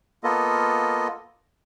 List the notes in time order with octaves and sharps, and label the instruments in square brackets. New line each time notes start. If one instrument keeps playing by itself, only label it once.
[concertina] A#3 B3 F4 A4 D#5